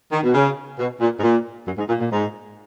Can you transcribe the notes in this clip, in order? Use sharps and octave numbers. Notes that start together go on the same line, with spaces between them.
D#3
B2
C#3
B2
A#2
G#2
A#2
F#2
G#2
A#2
A#2
G#2